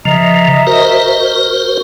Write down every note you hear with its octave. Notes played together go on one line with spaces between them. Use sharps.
C#3 F3 D#5 E5 A#5
F#4 A#4 C5